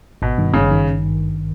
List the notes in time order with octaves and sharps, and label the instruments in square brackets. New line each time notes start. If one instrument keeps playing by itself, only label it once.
[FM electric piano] G#1 [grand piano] B2
[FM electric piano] G2 D#3
[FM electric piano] G#1 [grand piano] C#3
[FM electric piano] D#3